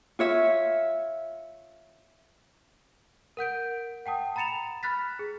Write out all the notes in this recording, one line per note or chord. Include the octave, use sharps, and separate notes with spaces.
F4 C#5 E5
A#4 F#5 G6 D7
F#5 G5 A5 D#6
A#5 B5 A6 C#7 E7 F7
B5 F6 F#6 A6 B6
G#4